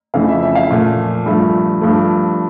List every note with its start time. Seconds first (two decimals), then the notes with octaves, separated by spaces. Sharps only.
0.14 F2 C#3 E3 A3 F5
0.28 E5
0.43 E5
0.55 F5
0.70 A#2 F3 A3
1.26 G2 F3 A3 E5
1.82 G2 F3 A3